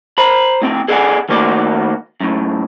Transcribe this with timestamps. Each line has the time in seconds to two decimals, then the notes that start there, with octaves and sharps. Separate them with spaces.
0.18 C5 A#5 B5
0.62 A2 C4 G5
0.88 G#4 A4 D5 D#5 F#5 G#5
1.29 D#3 A3 A#3 F#4 D5
2.21 F#2 A2